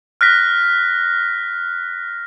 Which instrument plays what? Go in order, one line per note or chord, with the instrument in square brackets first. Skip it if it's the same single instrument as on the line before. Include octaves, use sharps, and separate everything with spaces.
[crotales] F6 F#6 A#6 B6